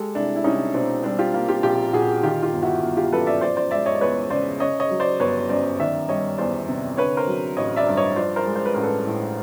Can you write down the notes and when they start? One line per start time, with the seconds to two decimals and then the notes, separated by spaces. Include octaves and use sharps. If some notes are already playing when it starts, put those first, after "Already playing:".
Already playing: G#3 G4 A4
0.15 C2 D4 E4
0.36 E4
0.44 C2 C#4 D#4
0.74 B2 C4 D4
1.04 G3 C4 D4
1.19 F4 G4
1.34 A#3
1.49 F4 G4
1.63 A#1 F4 G4
1.93 A#2 F#4 G#4
2.23 D#3 F4 G4
2.42 F4 G4
2.53 G1
2.62 E4 F#4
2.82 G1
2.97 F4 G4
3.12 F#2 A4 B4
3.27 D5 E5
3.41 F3 C5 D5
3.57 C5 D5
3.71 G#3 D5 E5
3.86 C#5 D#5
3.95 D5
4.01 E2 B4 C#5
4.30 C#3 C5 D5
4.60 C#3 C#5 D#5
4.80 C#5 D#5
4.90 F#3
5.00 C5 D5
5.20 G1 B4 C#5
5.49 F#2 C5 D5
5.80 D#3 D5 E5
6.09 G3 C#5 D#5
6.38 E2 C5 D5
6.68 C3
6.97 D3 B4 C#5
7.17 A#4 C5
7.27 F#3
7.57 A1 C#5 D#5
7.76 D5 E5
7.87 G2
7.97 C#5 D#5
8.16 F3 C5 D5
8.36 A#4 C5
8.46 G#3
8.56 C5
8.65 B4
8.74 A1 A#4
8.83 A4 B4
9.06 A2